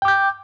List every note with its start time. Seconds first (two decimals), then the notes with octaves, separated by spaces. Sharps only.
0.02 G5
0.05 D6
0.08 G6